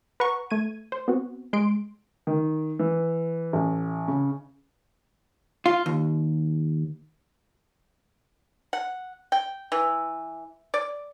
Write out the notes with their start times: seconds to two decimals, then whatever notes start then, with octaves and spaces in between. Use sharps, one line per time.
0.20 B4 F#5 A#5 C#6
0.51 A3 G#6 D#7
0.92 C5
1.08 B3 C4 F#4
1.53 G#3 C6 D7
2.27 D#3
2.79 E3
3.53 A1
4.08 C#3
5.66 F4
5.86 D#2
8.73 F#5
9.32 G5
9.72 E3
10.74 D5